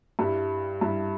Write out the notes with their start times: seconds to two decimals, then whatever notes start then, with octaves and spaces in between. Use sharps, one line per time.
0.19 G2 G3 E4
0.81 G2 G3 E4